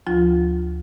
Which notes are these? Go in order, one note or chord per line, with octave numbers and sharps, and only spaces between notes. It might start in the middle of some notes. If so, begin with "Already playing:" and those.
D2 F3 F4